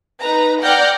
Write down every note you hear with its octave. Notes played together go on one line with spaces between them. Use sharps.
D#4 B4 A#5
D5 F#5 G5 F6 G6 A#6